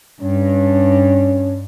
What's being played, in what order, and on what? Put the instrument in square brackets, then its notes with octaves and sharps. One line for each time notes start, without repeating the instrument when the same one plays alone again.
[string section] G2 [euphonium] C#4